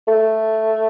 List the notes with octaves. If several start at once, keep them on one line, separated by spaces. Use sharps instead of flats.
A3